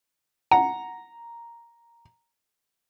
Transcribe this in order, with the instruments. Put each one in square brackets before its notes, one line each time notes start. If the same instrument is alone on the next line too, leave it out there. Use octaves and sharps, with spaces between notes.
[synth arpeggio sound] F#5 [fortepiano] A#5